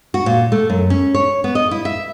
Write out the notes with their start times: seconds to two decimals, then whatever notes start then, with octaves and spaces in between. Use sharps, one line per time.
0.14 F#4
0.26 A#2
0.52 A3
0.70 F#2
0.90 C#4
1.14 C#5
1.44 B3
1.55 D#5
1.71 E4
1.85 E5